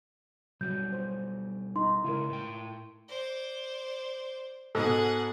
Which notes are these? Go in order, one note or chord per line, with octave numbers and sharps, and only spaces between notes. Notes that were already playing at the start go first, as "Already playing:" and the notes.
B2 F#3 G3 G6
C5
D#4 C6
C#3 G#3 E4 A#4
A2 G5
C5 D5
G#2 B2 G#4 A4 F#5